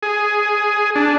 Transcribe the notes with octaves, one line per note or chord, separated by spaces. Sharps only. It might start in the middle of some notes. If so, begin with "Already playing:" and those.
G#4
D4